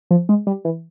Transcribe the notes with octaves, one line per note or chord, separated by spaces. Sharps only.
F3
G#3
G3
E3